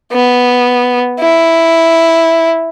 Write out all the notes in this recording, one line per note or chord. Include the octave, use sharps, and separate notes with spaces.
B3
E4